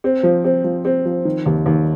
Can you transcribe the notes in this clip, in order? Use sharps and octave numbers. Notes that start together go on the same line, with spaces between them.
C4
F3
C4
F3
C4
F3
D#3
D#2
D#2